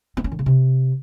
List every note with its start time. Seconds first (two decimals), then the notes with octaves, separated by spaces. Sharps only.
0.17 C4
0.24 C#4
0.32 D#3
0.39 C#3
0.46 C3